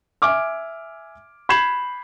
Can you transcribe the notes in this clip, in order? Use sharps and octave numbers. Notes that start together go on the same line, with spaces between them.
E5 G#5 D6 F6
B5 G6 G#6 C7 E7 F#7